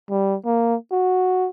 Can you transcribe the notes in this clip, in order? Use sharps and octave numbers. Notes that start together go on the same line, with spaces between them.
G3
A#3
F#4